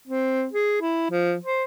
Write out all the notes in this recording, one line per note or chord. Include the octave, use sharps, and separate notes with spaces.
C4
G#4
E4
F3
C5